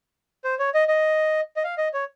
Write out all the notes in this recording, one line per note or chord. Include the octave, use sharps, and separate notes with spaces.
C5
C#5
D#5
D#5
D#5
F5
D#5
C#5